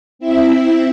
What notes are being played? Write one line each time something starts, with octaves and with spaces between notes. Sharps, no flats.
C4 E4 E5